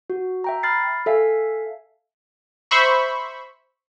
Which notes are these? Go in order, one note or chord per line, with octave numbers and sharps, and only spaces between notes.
F#4
E5 G5 A#5
B5 F6 A6 C7
A4 E5 F5 G#5
C5 E5 B5 C#6